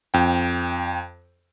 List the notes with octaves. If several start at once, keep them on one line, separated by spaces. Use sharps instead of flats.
F2 G5